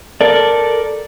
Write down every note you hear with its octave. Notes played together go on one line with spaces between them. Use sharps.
A4 A#4 D5